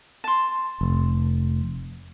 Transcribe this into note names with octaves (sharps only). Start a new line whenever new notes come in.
A5 C6
F1